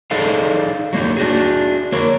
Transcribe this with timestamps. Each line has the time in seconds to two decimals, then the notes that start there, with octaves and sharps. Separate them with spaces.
0.11 D#4 G#4 A4 D5 F5
0.93 F#3 A#3 D#4
1.17 D4 F#4 G#4
1.92 A#3 A#4 C#5